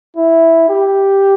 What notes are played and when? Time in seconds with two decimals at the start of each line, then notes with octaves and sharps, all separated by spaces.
0.17 E4
0.69 G4